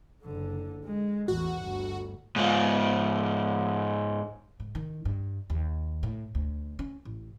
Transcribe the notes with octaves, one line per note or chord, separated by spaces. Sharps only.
F#1 D3
G#3
A1 E2 F#4
G1 D2
G#2 F4
G#2
D#3
G2
D#2
A2
D2
C#4
A1